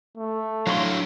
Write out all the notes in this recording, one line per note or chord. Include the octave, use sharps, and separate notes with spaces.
A3
F#3 D4 E4 F#4 F5 C6